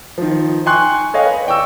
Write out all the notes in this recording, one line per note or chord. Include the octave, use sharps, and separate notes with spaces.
D#3 F3
G5 G#5 C6 C#6 F#6
A4 C#5 D#5 F5 G5 G#5
B4
D5 G5 C#6 E6